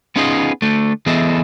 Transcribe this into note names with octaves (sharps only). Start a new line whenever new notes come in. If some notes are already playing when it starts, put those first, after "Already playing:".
B3 C#4 D#4 F4 G#4 D#5
D3 A3
E3 B3 G#4 A4 D#5 E5